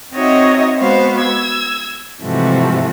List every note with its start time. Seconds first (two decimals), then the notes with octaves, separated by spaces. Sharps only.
0.14 C4 D#4 F#4 C#5 D#5 E5
0.79 G#3 B3 F#4 C5 F5
1.19 E6 G#6
2.22 G#2 C3 E3 F3 A3 F#4